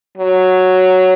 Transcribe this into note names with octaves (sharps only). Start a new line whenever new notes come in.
F#3